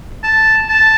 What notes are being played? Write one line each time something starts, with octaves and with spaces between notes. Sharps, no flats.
A5
A5